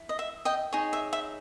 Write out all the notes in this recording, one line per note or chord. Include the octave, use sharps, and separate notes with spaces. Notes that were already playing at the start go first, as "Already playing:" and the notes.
Already playing: E4
D#5
E5
D#5 G5
D#4 G#4 C#5
E5
E5